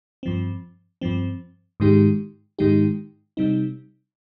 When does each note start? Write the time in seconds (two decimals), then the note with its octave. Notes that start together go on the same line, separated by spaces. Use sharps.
0.23 G2 F3 C4
1.01 G2 F3 C4
1.80 G#2 D#3 G#3 D#4 G4
2.59 G#2 D#3 G#3 D#4 G4
3.37 C3 G3 C4 D#4